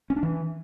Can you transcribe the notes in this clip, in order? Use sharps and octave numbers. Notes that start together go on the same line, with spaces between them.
C#4
D4
E3